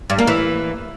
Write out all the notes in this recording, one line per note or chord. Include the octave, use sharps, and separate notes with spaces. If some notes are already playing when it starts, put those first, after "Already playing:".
G2
A#3
E3